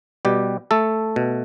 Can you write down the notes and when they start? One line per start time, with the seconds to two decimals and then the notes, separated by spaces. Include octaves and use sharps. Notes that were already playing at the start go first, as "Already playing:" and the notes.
0.25 B2 G3 G4
0.71 A3 A4
1.16 B2